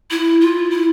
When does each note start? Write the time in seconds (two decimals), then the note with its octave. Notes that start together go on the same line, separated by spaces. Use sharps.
0.11 E4
0.41 F4
0.71 E4